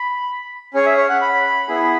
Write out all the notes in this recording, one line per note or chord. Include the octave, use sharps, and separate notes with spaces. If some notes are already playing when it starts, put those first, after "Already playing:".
Already playing: B5
C#4 G#4 C#5
E5
C#5
F#5
B5
B3 E4 G#4